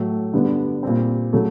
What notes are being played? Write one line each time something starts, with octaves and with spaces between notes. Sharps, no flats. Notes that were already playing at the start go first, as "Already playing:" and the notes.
Already playing: A2 F#3 A3
G2 D3 G3 B3 D4
A#2 G3 C4
C#3 F#3 A3